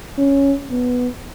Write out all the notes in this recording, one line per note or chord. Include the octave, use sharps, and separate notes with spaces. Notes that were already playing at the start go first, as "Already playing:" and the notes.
C#4
B3